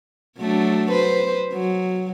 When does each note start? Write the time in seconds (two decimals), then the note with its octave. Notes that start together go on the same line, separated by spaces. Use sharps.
0.40 F#3 A3 D4
0.91 B4 C5
1.53 F#3